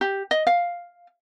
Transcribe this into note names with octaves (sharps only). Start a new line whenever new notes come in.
G4
D#5
F5